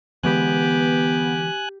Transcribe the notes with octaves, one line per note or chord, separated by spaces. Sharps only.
D3 E3 G#3 B3 G4 G#5 F#6